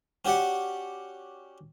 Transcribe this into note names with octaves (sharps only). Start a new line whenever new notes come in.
C#4 F#4 G4 D5 F#5